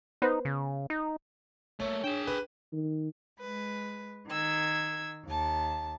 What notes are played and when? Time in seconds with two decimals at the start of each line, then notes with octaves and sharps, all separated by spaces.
0.22 B3 D#4 B4 C5
0.45 C#3
0.90 D#4
1.80 A3 A#3 C#5
2.04 D4 G#4 G5 E7
2.27 B4
2.73 D#3
3.40 G#3 B4
4.29 D#3 E6 G#6
5.25 D#2 A5